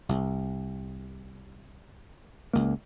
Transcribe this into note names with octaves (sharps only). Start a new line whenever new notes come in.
C2
C#2 A#3